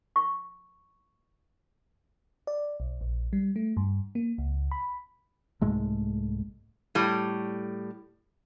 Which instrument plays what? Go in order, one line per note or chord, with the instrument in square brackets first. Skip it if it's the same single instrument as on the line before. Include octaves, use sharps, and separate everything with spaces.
[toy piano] C#6
[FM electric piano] D5
B1
A#1
G3
A3
G2
A#3
C#2
B5
[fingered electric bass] C2 G#2 G#3 A3
[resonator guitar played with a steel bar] A2 G3